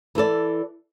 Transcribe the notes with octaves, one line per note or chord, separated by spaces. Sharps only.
E3 E4 A4 D5